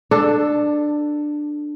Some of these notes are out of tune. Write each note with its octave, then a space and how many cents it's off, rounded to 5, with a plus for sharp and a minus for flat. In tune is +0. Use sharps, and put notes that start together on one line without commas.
D4 +15 A4 +0